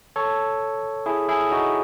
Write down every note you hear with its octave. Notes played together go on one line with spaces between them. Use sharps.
A4 C#5
E4 G#4
E4 G#4
D#4 F#4